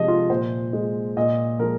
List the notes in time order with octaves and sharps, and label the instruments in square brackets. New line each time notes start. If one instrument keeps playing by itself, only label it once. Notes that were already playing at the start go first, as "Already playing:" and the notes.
Already playing: [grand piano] C3 F3 G#3 D#5
F4
A#2 C5
G#3
A#2 D#5
F3 G#3 A#4